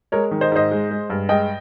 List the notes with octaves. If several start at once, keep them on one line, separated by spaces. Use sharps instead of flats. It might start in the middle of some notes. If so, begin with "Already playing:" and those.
G#3 A#4 C#5
D#3
C5 D#5
G#2 C5 D#5
G#3
G#3
G2
G#3 D#5 G5